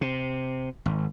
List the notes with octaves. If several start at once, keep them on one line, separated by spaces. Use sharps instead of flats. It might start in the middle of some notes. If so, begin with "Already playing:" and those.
C3
G#1